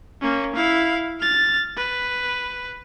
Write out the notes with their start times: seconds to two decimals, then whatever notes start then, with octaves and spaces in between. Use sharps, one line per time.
0.21 A#3 C#4
0.56 E4 F5
1.20 F6 A6
1.77 B4